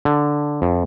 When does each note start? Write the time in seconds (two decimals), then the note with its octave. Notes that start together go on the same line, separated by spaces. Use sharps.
0.05 D3
0.62 F2